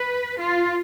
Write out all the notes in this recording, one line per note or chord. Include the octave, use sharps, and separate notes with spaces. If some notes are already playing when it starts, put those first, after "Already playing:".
Already playing: B4
F4